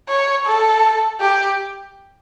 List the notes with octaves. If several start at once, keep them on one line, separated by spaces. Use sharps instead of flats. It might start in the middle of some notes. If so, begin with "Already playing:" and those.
C#5
A4
G4